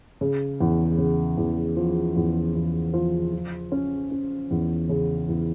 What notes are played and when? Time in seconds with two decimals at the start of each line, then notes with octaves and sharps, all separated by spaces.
0.21 C#3
0.60 E2
0.98 C#3
1.37 E2
1.77 F3
2.16 E2
2.55 E2
2.93 F3
3.33 F3
3.72 C#4
4.11 C#4
4.51 E2
4.89 C#3
5.29 E2